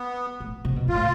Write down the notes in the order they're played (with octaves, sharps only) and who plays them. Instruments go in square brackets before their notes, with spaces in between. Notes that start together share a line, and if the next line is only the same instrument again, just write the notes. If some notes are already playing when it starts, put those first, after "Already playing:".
Already playing: [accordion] B3
[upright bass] A2
C3
B2
[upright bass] G#2 [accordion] F4
[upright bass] A2